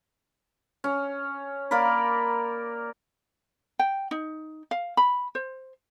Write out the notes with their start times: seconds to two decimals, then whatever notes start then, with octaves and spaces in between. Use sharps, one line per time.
0.84 C#4
1.71 A#3 A#4 D5 B5
3.79 G5
4.11 D#4
4.71 F5
4.97 B5
5.35 C5